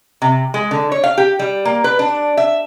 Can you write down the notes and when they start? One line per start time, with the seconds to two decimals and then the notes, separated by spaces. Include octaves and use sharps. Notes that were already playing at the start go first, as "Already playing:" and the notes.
0.22 C3
0.54 G#3
0.71 D3
0.92 C#5
1.04 F5
1.18 G4
1.39 G3
1.65 A#3
1.84 B4
1.99 D4
2.37 E5